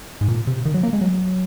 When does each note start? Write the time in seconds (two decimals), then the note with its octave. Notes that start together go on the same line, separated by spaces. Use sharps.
0.21 G#2
0.28 A#2
0.47 C3
0.65 D#3
0.74 F#3
0.83 A#3
0.93 G#3
1.01 F#3